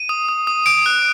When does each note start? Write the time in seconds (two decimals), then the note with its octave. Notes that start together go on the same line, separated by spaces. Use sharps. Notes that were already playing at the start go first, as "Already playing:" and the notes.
Already playing: D#7
0.09 D#6
0.29 D#6
0.47 D#6
0.66 D#6 D7
0.86 F#6